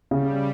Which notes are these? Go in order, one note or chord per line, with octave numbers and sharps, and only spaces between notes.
C#3 G3